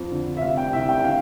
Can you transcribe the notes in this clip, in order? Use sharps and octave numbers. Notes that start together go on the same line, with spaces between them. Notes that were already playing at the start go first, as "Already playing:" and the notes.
Already playing: F2 F3
D3
E5
C3 F5
G5
C2 E5
G5
G5
D3 F5